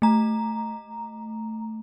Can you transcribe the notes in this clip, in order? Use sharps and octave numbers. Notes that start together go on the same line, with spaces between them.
A3 A#5